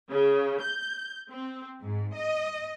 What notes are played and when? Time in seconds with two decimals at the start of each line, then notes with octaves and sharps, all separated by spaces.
0.11 C#3
0.62 G6
1.31 C4
1.82 G#2
2.14 D#5